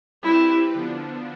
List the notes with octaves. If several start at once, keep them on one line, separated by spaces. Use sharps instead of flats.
G3 C4 E4 G4 B4
D3 F3 B3 D4